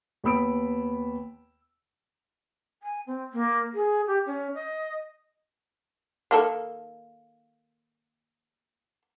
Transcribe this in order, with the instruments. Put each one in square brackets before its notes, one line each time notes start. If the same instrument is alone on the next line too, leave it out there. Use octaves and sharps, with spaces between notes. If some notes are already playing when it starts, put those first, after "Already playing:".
[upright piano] D#2 B3 B5 E6 D7
[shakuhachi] G#5
C4
A#3
G#4
G4
C#4
D#5
[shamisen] D#3 A#3 A4